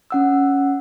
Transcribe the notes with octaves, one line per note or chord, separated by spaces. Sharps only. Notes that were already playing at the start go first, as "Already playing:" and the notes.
C#4 F#5 E6